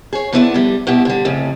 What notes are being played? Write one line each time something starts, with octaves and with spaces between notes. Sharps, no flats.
G#4 C#5
F3 B3 D4 E4 B4 D5
D3 G3
G2 B2 E4 G4
D3 G3
F2 A2 C#3